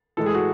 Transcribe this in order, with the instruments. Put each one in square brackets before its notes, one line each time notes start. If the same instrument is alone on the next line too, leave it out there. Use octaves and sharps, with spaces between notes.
[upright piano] A2 E3 G#3 A4
G#4
F#4